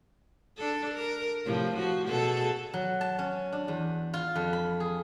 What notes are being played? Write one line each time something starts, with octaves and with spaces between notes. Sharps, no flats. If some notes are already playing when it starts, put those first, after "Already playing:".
D4 A4
A#4
A2 C3 F3
F3 F#4
B2 G#4 A4
F#3
A5
C#4
D4
E2
F4
F2
B5
G#4